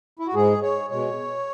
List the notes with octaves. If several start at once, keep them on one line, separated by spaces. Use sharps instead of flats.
E4
F#4
G#2 G#3 G#4
C#5
B2 G#3 C#5